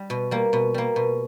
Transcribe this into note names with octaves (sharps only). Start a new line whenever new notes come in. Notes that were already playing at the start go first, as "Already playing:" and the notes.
Already playing: G3
B2
G3 A#3
B2
G3 A#3
B2